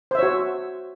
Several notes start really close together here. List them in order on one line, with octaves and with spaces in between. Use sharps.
C5 E5 C#5 F#4